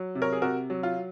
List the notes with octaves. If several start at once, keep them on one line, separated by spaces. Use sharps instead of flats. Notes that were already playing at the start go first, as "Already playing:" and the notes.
Already playing: F#3
C3
A#4 C#5
G#4
C3 F#4 A#4
F#3
F4